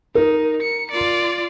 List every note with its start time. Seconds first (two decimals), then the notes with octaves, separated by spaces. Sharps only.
0.15 D#4 A#4
0.62 C#7
0.91 F4 D5